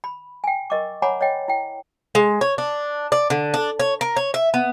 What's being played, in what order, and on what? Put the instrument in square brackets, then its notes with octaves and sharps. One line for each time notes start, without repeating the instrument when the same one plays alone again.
[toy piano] B5
G5 G#5
A#4 D#5 C#6 D6
C#5 F#5 G#5 A#5 B5 D6
C#5 D#5 G5
E4 G5
[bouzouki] G#3
C#5
D4
D5
D3
D4
C#5
A#4
C#5
E5
B3